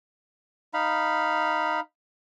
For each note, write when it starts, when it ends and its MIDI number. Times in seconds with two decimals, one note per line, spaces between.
0.74 1.80 63
0.74 1.80 77
0.74 1.80 83